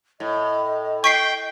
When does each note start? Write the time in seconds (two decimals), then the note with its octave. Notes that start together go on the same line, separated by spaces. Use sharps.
0.20 A2 D#5
1.04 G5 C#6 B6 C7